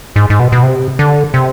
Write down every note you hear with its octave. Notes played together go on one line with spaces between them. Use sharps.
G#2
G#2
B2
B2
C3
D3
C3